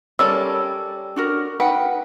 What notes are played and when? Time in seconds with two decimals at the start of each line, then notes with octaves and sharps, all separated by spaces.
0.19 G3 C#4 A4 A#4 D5 E6
1.16 D4 F#4 A#4
1.60 D#4 B4 F#5 G5